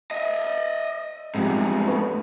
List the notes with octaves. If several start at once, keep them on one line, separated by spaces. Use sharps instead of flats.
D#5 E5
E2 G#2 C3 F3 G3
A3 B4 C#6